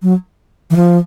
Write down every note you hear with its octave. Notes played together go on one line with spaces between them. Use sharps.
F#3
E3
F3